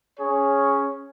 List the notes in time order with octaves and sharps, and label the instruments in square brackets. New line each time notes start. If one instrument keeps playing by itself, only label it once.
[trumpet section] C#4 G#4 C#5